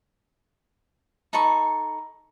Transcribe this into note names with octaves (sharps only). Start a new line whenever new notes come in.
D#4 A4 B5 C#6